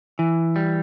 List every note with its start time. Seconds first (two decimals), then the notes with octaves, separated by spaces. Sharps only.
0.19 E3
0.56 G3